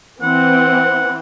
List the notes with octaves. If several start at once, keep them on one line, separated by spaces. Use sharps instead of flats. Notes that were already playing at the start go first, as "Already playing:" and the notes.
E3 C4 F#5